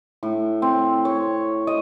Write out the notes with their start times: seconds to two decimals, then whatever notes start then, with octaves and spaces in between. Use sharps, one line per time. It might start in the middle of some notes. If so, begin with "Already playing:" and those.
0.23 A2
0.62 C4
1.05 C#5
1.67 D#5